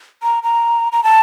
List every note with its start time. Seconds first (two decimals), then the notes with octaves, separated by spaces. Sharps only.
0.23 A#5
0.43 A#5
0.92 A#5
1.03 A5